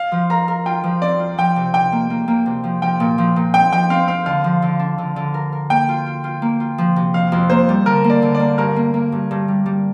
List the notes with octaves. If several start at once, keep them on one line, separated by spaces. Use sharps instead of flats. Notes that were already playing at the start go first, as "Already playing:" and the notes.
Already playing: F5
F3
A#4 A#5
A#4
F4 G5
F3
C4 D5
F4
F3 G5
C3
C3 G5
A#3
A#3
A#3
C3
F3
F3 G5
A#2
F3
A#2
C4 G5
F3 G5
C4 F5
C4 F5
D3 F5
F3
D3
D4
D3
D3
A#4
A#4
A#3 G5
F4
F4
F4
A#3
F4
F3
C3
F2 F5
F2
A#3 C5
G3
D3 A#4
A#3
D5
D3
D5
A#3
G2 A#4
A#3
A#3
G2
G2
G3
G3